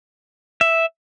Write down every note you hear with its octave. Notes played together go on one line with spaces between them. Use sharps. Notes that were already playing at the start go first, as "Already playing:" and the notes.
E5